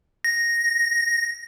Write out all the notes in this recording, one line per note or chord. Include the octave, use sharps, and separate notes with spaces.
A#6